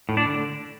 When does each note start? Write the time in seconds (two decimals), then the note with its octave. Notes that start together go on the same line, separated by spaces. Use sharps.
0.09 A2
0.17 D4
0.25 D3